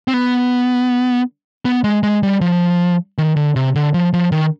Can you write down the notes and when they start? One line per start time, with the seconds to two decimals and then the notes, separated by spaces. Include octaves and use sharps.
0.08 C4
0.14 B3
1.65 B3
1.84 G#3
2.03 G#3
2.23 G3
2.41 F3
3.18 D#3
3.36 D3
3.56 C3
3.75 D3
3.94 F3
4.13 F3
4.32 D#3